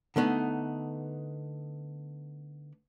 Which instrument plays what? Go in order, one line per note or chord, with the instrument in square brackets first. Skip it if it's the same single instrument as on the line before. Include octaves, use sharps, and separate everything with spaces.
[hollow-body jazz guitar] D3 A3 B3 D#4